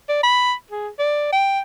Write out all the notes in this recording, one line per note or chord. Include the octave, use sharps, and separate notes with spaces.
D5
B5
G#4
D5
G5